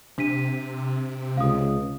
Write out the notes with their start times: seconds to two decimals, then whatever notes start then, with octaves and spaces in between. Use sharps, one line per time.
0.18 C3 D4 B6 D#7
1.37 C#2 F5 D#6